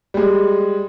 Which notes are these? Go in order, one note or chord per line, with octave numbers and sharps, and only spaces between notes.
G3 G#3